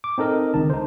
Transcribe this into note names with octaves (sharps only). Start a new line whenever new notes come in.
D6
C4 D#4 A4 A#4 D#5
C#2 D3 D#3 A5
D#4 C5